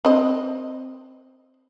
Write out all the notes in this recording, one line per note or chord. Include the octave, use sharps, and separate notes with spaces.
C4 D#5